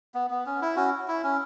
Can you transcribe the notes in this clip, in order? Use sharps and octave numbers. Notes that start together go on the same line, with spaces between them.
B3
B3
C#4
E4
C#4 F#4
E4
C#4